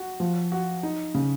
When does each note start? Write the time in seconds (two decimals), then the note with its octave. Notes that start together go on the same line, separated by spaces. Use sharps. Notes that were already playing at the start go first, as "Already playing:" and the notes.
Already playing: F#4
0.20 F3
0.52 F#4
0.83 D#4
1.14 C#3